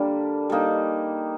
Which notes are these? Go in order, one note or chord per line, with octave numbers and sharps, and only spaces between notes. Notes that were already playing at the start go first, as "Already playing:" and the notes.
Already playing: D3 G3 A#3 D4
G3 A#3 D#4